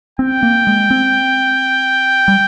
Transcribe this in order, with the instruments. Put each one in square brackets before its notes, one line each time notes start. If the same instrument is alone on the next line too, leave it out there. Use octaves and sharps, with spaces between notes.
[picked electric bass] C4 [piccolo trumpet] G5
[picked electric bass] A#3
G#3
C4
G3